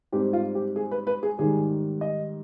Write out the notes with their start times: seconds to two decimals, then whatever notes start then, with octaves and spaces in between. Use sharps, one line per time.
0.12 G#2 G3 C4 G4
0.33 F4
0.55 G4
0.76 G#4
0.91 B4
1.07 B4
1.23 G#4
1.38 G#2 D#3 G3 G#4
2.01 D#5